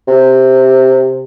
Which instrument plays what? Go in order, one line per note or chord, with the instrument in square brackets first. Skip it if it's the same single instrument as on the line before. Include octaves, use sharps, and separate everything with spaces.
[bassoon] C3